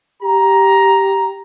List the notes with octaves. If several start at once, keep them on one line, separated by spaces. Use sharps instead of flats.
G4 A#5